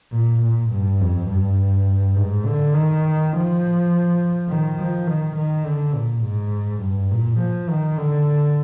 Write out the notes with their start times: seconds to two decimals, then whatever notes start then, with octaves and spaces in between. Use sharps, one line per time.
0.12 A#2
0.42 A#2
0.71 G2
1.00 F2
1.29 G2
2.16 G#2
2.46 D3
2.75 D#3
3.33 F3
4.49 D#3
4.78 F3
5.07 D#3
5.36 D#3
5.66 D3
5.94 A#2
6.24 G#2
6.82 G2
7.11 A#2
7.39 F3
7.69 D#3
7.98 D3